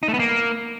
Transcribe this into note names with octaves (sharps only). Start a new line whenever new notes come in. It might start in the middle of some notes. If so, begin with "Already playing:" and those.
D#4
A3
B3
A#3